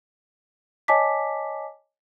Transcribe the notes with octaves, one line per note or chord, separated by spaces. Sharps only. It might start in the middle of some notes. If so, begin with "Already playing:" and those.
C#5 D#5 G#5 A5 D6 B6